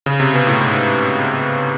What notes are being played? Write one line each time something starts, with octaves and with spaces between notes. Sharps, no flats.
C#3
C3
B2
A2
G#2